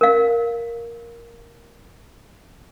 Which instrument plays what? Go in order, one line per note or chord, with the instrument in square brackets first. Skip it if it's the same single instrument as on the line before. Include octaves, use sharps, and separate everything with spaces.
[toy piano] A#4 F5